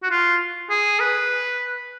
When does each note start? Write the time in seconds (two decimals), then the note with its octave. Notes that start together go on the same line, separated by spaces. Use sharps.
0.03 F#4
0.10 F4
0.70 G#4
1.00 B4